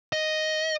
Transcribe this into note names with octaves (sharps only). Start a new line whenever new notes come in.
D#5